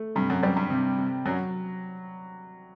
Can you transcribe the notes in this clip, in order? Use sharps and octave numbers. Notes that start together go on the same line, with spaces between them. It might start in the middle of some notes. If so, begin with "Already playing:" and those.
Already playing: A3
G2 C3
F#2
F#2 G3
G2
C3
C3
F#2 F#3